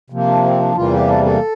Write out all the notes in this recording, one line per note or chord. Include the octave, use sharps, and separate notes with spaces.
C3 F3 A#3
D4
C4
D4
E2 C3 E3 G3 A#3 F4
G4
A4
A4